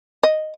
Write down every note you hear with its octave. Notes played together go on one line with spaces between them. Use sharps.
D#5